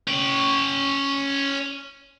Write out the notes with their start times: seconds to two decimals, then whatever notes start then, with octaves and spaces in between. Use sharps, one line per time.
0.08 C#4 G5